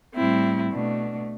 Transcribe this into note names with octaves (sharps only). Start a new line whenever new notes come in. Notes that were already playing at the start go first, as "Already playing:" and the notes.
A2 G3 C4 E4
B2 A3 D4